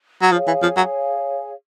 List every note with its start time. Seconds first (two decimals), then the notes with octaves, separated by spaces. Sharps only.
0.22 F#3
0.32 F3 G#4 C#5 F5 G#5
0.47 E3
0.62 F3
0.77 F#3